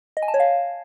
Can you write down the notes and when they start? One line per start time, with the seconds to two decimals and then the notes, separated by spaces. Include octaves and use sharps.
0.17 D#5
0.22 G#5
0.28 A5
0.34 C#5
0.40 F5